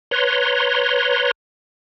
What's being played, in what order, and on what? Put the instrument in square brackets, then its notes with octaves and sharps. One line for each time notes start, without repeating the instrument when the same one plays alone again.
[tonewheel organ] B4 C#5 A#5 C6